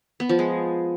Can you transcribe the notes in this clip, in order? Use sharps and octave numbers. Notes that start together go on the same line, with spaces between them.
B3
F3
G#3